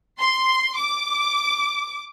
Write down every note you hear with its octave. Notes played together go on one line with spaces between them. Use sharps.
C6
D6